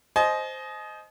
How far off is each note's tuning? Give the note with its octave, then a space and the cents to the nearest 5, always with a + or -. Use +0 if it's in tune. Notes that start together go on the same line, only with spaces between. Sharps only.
C5 +0 D#5 +0 G#5 +45